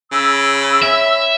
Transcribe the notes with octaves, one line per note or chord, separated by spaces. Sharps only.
C#3 B5 E6
C#4 E5